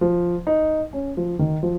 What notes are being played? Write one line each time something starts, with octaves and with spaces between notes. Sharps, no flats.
F3
D#4
C#4
F3
D#3
F3